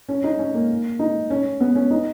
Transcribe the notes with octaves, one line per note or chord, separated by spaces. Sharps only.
C#4
D#4
C#4
A#3
D#4
C#4
B3
C#4
D#4